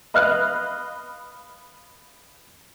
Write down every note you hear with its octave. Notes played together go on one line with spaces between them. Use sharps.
B4 D#5 F5 F6 F#6